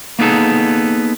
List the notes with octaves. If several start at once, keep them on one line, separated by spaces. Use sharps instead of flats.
A#3 B3 D#4 G#4 A4